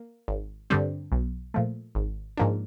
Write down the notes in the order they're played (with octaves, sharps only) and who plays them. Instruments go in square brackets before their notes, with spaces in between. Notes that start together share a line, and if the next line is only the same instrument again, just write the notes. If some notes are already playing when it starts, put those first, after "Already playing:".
Already playing: [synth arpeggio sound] A#3
G#1
G2 D3 G3 C4
B1
A#2 F3 A3
G#1
G#2 F3 A#3 D4